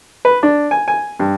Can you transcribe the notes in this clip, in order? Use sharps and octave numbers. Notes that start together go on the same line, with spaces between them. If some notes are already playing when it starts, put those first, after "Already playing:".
B4
D4
G#5
G#5
G2